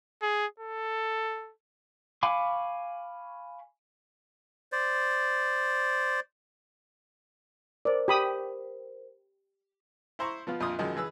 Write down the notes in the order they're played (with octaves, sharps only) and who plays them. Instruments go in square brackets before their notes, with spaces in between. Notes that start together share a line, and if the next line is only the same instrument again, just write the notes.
[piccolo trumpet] G#4
A4
[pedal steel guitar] F5 G#5 B5 C#6 D6
[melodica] C5 D5
[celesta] A#4 C5 [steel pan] D5
[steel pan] G4 B5 D#6
[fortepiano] E4 C5 A#5 C#6
F3 B3 F4
A#1 F2 A#2 F4 C6 D#6
F#2 D#3 F3 G#3 D#5
E3 G#4 B4 E6